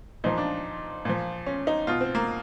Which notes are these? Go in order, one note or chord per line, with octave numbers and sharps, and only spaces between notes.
A#2 F3 D#4
D4
A#2 F3
C#4
D#4
B2 F4
C4
A#3